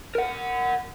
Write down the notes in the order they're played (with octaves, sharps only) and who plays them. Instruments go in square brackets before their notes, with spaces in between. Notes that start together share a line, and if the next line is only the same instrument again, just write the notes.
[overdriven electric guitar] A#4 F#5